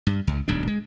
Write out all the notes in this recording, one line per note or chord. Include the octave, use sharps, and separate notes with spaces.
G2
C#2
D1 B1 G#2 D4
G#3